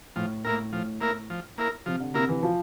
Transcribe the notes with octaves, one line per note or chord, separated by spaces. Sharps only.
A2 F3
A2 A#3 E4 A#4
A2 F3
A#3 E4 A#4
F3
A#3 E4 A#4
C3 F3
D3
C3 A#3 E4 A#4
E3
F3